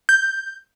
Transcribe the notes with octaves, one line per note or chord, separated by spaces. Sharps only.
G6